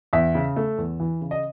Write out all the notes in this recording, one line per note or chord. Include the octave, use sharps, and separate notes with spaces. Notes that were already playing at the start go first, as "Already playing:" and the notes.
E2 E5
C#3
A3
E2
E3
C#3
D#5